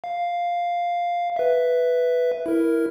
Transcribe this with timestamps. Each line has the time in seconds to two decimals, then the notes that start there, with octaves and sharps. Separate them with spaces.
0.04 F5
1.36 B4 E5
2.46 E4 A#4